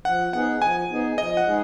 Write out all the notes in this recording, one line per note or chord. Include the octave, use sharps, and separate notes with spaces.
F3 F#5
B3 D#4 G#4 F#5
F3 G#5
B3 D#4 G#4
F3 D#5
F#5
G#3 D#4 G#4